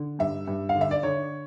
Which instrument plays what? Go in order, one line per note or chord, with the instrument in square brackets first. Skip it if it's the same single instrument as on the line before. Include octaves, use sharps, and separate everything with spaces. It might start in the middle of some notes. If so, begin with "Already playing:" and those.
Already playing: [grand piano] D3
G2 E5
G2
F5
D3
E5
D5
D3 C#5